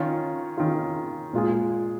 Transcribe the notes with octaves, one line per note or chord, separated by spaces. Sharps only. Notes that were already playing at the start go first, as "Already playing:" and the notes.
Already playing: D#3 C#4 F4
D#3 C#4 F4
A#2 G#3 F4 G#4